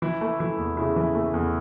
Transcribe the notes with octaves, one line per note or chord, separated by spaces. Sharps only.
E3 E4
A3
E3 E4
E2
C#3 E4
E3
A3
E2